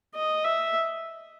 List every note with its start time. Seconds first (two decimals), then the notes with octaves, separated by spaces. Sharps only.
0.15 D#5
0.45 E5